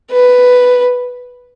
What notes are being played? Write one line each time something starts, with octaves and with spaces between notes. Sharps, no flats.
B4